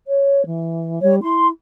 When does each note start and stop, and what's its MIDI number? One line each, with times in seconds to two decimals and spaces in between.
0.07 0.45 73
0.46 1.02 52
1.02 1.22 55
1.02 1.15 73
1.22 1.51 64
1.22 1.47 84